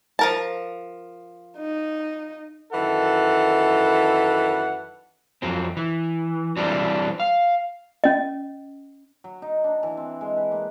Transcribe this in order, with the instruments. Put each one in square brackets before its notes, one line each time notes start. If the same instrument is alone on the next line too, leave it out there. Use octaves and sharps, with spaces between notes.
[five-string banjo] F3 A#4 A5
[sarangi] D#4
[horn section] F#2 D#3 E3 A4 F#5
[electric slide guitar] F2 F#3 C4
E3
E3 F#3 G3 C4 D4
F5
[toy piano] C#4 D#5
[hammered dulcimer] F#3
D#4
D4
E3
C4
G#3
B4
A#3